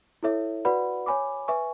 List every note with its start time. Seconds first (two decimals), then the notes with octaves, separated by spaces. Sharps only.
0.23 E4 A4 C#5 E5
0.65 F#4 B4 D5 F#5 B5
1.06 C#5 G#5 B5 D6
1.48 B4 E5 G#5 C#6